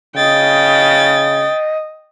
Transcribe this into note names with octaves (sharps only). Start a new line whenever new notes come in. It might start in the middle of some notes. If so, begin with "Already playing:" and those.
C#3 D#5 G5 A6